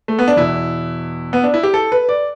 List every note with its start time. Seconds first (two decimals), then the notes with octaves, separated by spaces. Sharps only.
0.08 A3
0.19 B3
0.28 D4
0.37 E2 B2 E4
1.33 B3
1.44 D4
1.54 E4
1.63 G4
1.74 A4
1.92 B4
2.09 D5